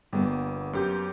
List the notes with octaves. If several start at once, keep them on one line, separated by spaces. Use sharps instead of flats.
G1 G3 A#3 B3
F#2 G4 G6